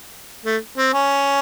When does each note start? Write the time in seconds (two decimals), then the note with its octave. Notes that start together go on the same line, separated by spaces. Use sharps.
0.45 A3
0.77 C4
0.93 C#4